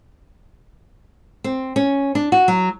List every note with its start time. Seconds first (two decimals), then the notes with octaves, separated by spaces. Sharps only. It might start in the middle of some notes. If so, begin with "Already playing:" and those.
1.44 C4
1.76 C#4
2.15 D4
2.32 F#4
2.48 F#3